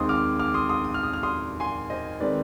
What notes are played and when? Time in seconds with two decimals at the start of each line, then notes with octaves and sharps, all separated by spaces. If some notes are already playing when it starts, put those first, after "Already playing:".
Already playing: D#2 D#3 G#3 C4 C6 D#6
0.09 D6 F6
0.39 D6 F6
0.54 C6 D#6
0.69 C6 D#6
0.84 D#6
0.94 F6
1.03 D#6
1.13 F6
1.23 C6 D#6
1.60 G#5 C6
1.90 C5 D#5
2.20 D#3 G#3 C4 B4 D5